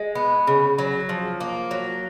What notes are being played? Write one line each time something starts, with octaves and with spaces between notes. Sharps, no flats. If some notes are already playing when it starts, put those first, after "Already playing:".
Already playing: G#3
B3
C#3
F#3
F3
A#3
F#3